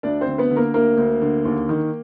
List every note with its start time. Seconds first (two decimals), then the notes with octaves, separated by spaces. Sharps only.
0.03 D2 D4 D5
0.21 C4 C5
0.27 D3
0.38 B3 B4
0.51 D3
0.56 A#3 A#4
0.74 D2 A#3 A#4
0.97 D2
1.21 D3
1.45 D#2
1.69 D#3